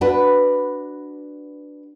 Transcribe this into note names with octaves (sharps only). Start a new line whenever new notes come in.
D4 F#4 B4